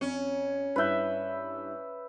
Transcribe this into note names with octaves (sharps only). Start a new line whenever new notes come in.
F2 C#4
G2 E4 B4 E5 G6